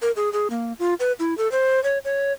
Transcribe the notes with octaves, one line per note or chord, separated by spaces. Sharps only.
A#4
G#4
G#4
A#3
F4
B4
E4
A4
C5
C#5
C#5